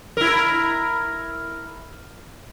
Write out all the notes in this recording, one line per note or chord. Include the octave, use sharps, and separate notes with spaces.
E4 A#4